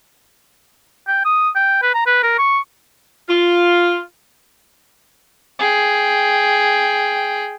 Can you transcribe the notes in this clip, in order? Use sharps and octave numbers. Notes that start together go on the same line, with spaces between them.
G5
D#6
G5
B4
A#5
B4
A#4
C#6
F4
G#4 G5